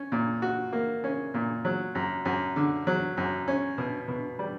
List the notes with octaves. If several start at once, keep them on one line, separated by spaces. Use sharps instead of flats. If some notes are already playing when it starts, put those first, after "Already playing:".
Already playing: C#4
A#2
F#4
A#3
C#4
A#2
F#3
F#2
F#2
D3
F#3
F#2
C#4
B2
B2
G3